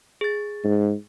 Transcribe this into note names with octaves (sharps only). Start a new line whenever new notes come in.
G#4 A6
G#2